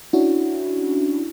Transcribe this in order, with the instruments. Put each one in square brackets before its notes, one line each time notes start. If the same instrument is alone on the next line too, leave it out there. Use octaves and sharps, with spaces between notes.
[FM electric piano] C#4 D4 E4 F#4